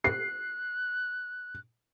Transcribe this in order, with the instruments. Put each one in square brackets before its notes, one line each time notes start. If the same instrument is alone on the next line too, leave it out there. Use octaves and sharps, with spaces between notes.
[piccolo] F#6 [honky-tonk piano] C7